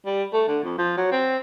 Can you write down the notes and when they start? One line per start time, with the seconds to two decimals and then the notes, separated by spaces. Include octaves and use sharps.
0.06 G3
0.33 A3
0.48 D3
0.64 F2
0.78 F3
0.97 F#3
1.12 C4